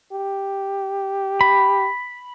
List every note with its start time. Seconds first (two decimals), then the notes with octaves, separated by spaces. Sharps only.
0.13 G4
1.41 B5